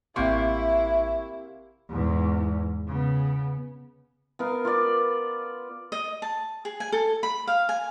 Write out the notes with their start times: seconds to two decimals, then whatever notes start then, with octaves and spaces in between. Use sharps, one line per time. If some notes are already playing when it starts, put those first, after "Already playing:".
0.16 A1 C3 A#3 E4 E5 C#6
1.89 E2 G#2
2.87 C#3 B3
4.39 B3 A#4 F5
4.65 F4 B4 D5
5.92 D#5
6.22 A5
6.65 G#4
6.80 G#5
6.92 A4
7.23 B5
7.47 F5
7.69 G#5